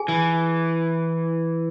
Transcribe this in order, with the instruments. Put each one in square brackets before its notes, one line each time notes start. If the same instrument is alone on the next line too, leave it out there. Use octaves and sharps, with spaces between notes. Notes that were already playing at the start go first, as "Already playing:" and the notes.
Already playing: [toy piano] G#4 G#5
[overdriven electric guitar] E3